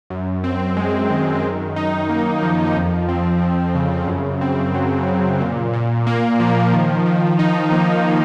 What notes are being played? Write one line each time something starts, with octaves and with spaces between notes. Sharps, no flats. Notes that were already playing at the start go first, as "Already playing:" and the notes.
F#2
C4
G#3
D#3
F#2
D#4
A#3
F3
F2
C4
F3
C#3
F#2
C4
F#3
C#3
A#2
A#2
A#3
F3
D#3
D#3
D#4
A#3